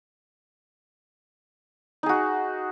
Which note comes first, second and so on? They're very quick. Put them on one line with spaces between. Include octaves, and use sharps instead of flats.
D#4 G#4 F#4